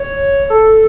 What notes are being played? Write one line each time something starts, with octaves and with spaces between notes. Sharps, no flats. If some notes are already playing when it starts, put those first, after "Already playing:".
Already playing: C#5
A4